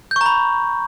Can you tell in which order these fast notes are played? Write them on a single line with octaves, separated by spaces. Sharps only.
G6 C#6 A#5 B5